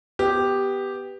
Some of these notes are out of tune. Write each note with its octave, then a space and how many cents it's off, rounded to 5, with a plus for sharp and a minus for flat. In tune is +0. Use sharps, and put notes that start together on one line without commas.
B3 +0 G4 +0